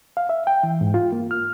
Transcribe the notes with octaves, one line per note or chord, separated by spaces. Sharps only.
F5
E5
G5
E3
G#2
F4
A#3
F6